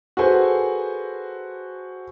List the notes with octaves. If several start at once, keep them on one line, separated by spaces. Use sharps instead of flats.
F#4 G#4 A4 B4 C5 G#5